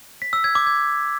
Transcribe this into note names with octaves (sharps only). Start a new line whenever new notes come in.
B6
E6
G#6
D6
G#6